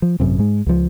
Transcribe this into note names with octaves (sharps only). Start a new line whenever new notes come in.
F3
G#1 F#2 C3
G#2 G#3
C#2 F3